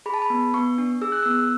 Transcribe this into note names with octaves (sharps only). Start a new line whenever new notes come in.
G#4 B5
A5
B5
B3
B3 C#6
D4
G#4 E6
F#6
B3 E6